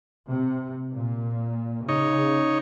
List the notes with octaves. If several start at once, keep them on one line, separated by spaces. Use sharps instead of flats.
C3
A#2
C#3 D#4 C#5